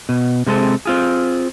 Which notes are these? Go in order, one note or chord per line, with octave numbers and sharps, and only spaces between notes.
B2
C3 G#3 C4 A4
C4 F4 G#4